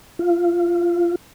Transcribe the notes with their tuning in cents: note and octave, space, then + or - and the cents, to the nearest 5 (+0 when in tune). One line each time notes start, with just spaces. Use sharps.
F4 -15